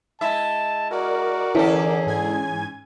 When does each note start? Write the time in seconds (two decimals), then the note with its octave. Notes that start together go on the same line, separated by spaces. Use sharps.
0.21 G#3 E4 E5 A5
0.91 F#4 A#4 D5
1.55 D3 E3 C#4 G#4 A4
2.07 G#2 G#5 G#6